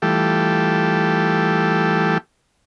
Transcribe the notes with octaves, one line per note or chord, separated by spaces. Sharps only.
E3 G3 A3 F4 G4 A4